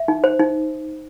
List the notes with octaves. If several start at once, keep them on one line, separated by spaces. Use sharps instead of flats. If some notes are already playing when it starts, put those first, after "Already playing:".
Already playing: E5
D#4
C5
D#4